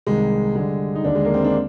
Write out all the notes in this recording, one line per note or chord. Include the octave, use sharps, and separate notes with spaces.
C2 C3 D#3 G#3
G2 D3 G#3
D#4
D#2 D3 D4
G#3
A#3
C4
D4